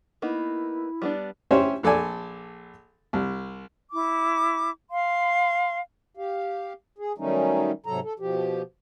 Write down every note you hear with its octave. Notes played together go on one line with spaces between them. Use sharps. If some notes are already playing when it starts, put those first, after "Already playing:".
A#3 B3 D#4 E4
G3 B3 D4
C#4 E4 G4 C5 C#5
A#1 A4 D5 G#5
C2
E4 D6
F5 C6
G4 F5
G#4
D#3 F#3 G3 A3 C#4 D#4
G#2 C3 F#3 A4 A#5
A4
B2 F3 G4